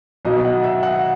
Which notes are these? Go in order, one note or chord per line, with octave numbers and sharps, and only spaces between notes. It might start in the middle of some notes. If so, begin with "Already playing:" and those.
B1 B2 F#3 D#5
F#5
E5
F#5